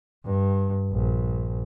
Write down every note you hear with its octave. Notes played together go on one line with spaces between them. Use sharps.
G2
A#1